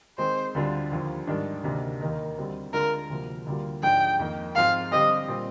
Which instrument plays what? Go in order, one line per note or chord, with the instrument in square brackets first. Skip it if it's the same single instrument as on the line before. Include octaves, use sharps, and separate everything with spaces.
[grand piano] D#3 G#3 C4 [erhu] C5
[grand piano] D2 D3 G3 D4 F4
D#2 D3 F3
G#2 D#3 G3 D4
D2 C3 D#3 A#3 D4
D#2 D#3 A#3 D#4 A#4
D2 D3 G3 C4
[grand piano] D3 G#3 D4 F4 [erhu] A#4
[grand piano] D2 C3 F3 A#3
D2 D3 G3 A#3 F4
[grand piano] G#2 F3 G#3 D4 [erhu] G5
[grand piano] F2 D#3 A#3 D#4
[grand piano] G#2 F3 G#3 C4 F4 [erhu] F5
[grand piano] D3 G3 C4 G4 [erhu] D#5
[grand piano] A#2 G3 C4